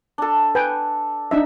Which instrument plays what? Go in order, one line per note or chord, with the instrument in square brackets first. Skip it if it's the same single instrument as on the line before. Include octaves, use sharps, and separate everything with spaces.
[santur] D4 A4
[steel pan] B4 G5 G#5
D4 D#4 E5